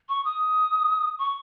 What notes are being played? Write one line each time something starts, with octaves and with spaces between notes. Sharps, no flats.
C#6
D#6
C#6